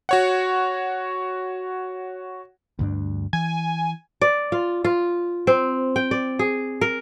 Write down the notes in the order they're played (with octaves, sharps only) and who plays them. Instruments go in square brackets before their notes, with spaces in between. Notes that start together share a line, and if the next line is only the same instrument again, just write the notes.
[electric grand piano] F#4 C#5 F#5
[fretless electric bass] D2 G2 D4
[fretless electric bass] E3 [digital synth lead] G#5
[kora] D5
F4
F4
C4
G5
D5
G#4
A#4